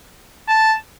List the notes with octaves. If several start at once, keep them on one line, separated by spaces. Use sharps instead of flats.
A5